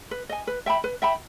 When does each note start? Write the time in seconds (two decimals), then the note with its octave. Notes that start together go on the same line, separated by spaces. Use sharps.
0.11 B4
0.29 D#5 G#5
0.47 B4
0.66 E5 G5 B5
0.84 B4
1.02 E5 G5 B5